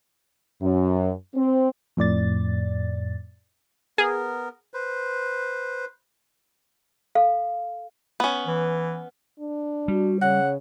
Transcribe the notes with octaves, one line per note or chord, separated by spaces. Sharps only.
F#2
C4
F2 A2 D5 A6
B3 G#4 A#4
B4 C5
A4 F5
B3 C#4
E3
D4
G3 F#4
C#3 C#5 F#5